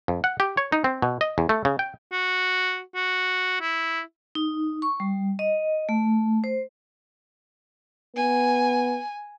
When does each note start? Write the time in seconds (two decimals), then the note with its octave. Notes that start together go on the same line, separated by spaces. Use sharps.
0.08 F2
0.24 F#5
0.40 G4
0.57 C#5
0.72 D#4
0.84 C4
1.02 B2
1.21 D#5
1.38 E2
1.49 A3
1.65 C#3
1.79 G5
2.12 F#4
2.95 F#4
3.61 E4
4.35 D#4
4.82 C#6
5.00 G3
5.39 D#5
5.89 A3
6.44 C5
8.17 B3 G#5